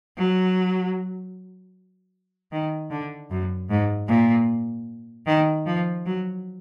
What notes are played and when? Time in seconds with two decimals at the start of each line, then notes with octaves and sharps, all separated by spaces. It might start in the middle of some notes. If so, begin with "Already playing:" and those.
0.17 F#3
2.52 D#3
2.91 D3
3.31 F#2
3.70 G#2
4.08 A#2
5.26 D#3
5.66 F3
6.05 F#3